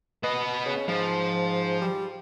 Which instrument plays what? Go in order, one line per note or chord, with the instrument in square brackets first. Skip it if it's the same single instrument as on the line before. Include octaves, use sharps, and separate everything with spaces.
[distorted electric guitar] B3 D#5 [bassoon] B4
[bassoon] C#3
[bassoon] G#2 [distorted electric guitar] F3
[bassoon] G3